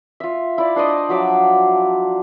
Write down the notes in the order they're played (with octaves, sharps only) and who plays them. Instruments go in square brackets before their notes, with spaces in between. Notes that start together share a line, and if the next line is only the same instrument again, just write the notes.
[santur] F4 E5
E4 D5
D4 C5 D5 D#5
F3 F#3 E5 D6